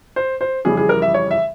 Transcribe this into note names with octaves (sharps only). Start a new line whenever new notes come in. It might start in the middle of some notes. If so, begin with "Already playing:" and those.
C5
C5
F2 C#3 E3 G3 G#4
G#4
A#4
E5
C#5
E5